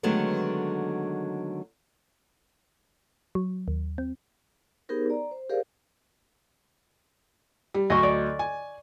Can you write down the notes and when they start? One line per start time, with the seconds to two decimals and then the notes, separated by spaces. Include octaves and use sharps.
0.03 D3 D#3 F#3 G#3 A3 B3
3.35 F#3
3.68 D#2
3.98 C4
4.89 B3 D#4 G4 G#4 A#4 C5
5.10 D5 A#5
5.31 C5
5.49 G4 G#4 A#4 C5 D5 F5
7.74 G3
7.90 D2 F#3 D#5 C#6
8.03 D5
8.39 G#5